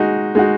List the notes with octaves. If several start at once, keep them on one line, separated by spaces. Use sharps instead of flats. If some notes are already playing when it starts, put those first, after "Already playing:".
Already playing: G#3 D#4 F#4
G#3 D#4 F#4